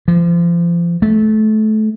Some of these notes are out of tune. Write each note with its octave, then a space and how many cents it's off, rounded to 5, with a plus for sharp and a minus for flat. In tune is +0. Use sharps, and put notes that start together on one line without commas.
F3 -30
A3 -25